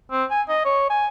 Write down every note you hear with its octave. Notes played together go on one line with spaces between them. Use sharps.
C4
G#5
D#5
C#5
G#5